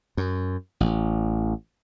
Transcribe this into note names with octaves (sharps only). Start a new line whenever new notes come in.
F#2
A1